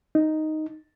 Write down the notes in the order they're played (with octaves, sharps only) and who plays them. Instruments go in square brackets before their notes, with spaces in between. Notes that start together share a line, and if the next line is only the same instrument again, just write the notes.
[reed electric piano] D#4